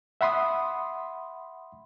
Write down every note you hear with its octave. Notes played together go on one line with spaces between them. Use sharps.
E5 F#5 B5 C6 D#6